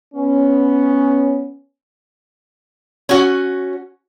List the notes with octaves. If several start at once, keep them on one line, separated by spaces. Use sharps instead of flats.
B3 C#4
C#4 F#4